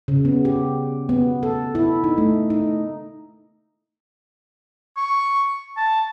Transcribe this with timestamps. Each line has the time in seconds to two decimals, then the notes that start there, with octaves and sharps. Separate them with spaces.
0.08 C#3
0.25 B3
0.45 G4
1.09 B3
1.43 A4
1.75 E4
2.04 D#4
2.18 A3
2.50 D#4
4.97 C#6
5.77 A5